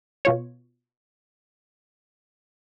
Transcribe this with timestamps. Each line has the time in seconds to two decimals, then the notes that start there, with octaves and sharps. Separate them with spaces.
0.25 B2 F4 C#5